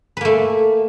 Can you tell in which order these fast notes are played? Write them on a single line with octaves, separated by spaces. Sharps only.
B4 A#3 A3